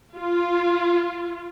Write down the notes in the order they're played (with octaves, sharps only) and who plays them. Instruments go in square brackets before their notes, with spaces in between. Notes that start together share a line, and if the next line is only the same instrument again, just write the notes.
[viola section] F4